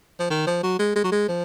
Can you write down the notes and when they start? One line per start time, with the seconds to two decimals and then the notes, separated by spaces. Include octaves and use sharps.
0.19 F3
0.30 D#3
0.47 F3
0.63 F#3
0.79 G#3
0.96 G#3
1.04 F#3
1.12 G#3
1.28 F3